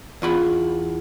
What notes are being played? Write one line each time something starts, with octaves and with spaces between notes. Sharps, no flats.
E2 F4 B5